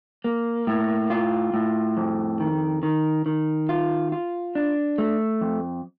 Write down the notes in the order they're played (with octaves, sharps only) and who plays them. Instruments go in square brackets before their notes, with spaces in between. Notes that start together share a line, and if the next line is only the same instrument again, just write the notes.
[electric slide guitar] A#3
A2
F4
A2
F2
D#3
D#3
D#3
F4
F4
D4
A3
F2